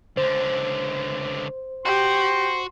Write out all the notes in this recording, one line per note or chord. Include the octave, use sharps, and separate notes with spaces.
C#2 D3 C5
F#4 G4 C6